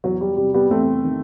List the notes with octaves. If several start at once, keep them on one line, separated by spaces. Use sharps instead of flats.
E2 F#3
G3
C3 G3
G3 B3
E2 A3 C4
D#3